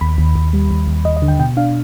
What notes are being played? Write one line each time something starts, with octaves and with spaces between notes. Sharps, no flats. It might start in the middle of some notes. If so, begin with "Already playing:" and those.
D#2 B5
D#2
D#2
G3
D#2
D#2
D#2 D#5
D#5
D3
G5
B2 G5
D4 F5